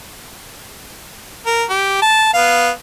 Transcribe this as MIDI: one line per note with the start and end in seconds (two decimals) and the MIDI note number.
1.46 1.64 70
1.70 1.98 67
2.02 2.29 81
2.33 2.70 59
2.33 2.70 77